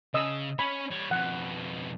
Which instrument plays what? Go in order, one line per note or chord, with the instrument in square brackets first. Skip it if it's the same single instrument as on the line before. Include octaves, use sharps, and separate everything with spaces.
[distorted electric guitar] C#3 [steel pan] D#5 D#6 E6
[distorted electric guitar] C#4 C#5 [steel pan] B5
[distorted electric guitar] G3 C#5
[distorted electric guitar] F2 B2 [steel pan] F#5